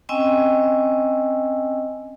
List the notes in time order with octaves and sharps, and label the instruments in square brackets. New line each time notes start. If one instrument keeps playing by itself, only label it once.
[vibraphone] C4 C#4 D#5 G5 G#5 E6